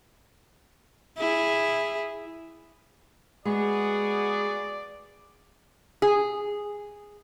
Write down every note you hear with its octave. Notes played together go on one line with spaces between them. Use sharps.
E4 G#4
G#3 B3 F#4 G#4 D5
G#4